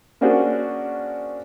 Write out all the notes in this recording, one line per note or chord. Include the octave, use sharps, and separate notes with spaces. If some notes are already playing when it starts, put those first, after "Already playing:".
A#3 C#4 D4 F#4 G#4 C5